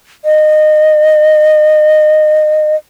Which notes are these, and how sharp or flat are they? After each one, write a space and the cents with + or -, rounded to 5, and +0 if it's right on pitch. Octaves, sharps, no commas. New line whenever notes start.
D#5 -25